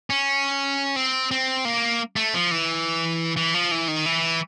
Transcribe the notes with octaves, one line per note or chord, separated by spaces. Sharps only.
C#4
C4
C4
A#3
A3
F3
E3
E3
F3
E3
D#3
E3